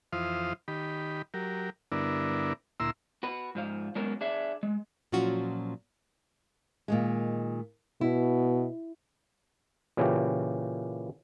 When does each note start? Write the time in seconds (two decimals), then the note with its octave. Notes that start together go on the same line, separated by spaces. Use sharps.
0.13 F2 E3 F4 C5 F5 D#6
0.68 D#3 G4 B5
1.34 F#3 G4 A#4
1.92 G2 D3 B3 D4 E4 A#4
2.80 D2 A#2 E4 A#5 C6 E6
3.23 F#4 B4
3.55 G#2 F3 F5
3.95 F#3 G#3 B3 C#4 F#4 A#4
4.21 D4 G#4 E5
4.63 G#3
5.12 A#2 F3 F#3 C#4 F4 F#4
6.88 A#2 D#3 G#3
8.01 B2 E4
9.97 A#2 C#3 E3 C#4 G4